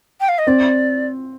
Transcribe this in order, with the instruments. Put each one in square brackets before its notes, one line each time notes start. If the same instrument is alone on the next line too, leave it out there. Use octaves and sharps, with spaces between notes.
[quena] G5
F5
D#5
[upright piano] C4 [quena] D5